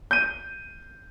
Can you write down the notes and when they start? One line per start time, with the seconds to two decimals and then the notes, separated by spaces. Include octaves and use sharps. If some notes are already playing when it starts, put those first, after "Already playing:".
0.11 G6 D#7